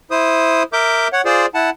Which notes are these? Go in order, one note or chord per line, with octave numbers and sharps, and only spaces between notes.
E4 C5 D#6
A#4 E5 D6 G6
C#5 F#5
F4 G#4 C5 D5
E4 F#5 A5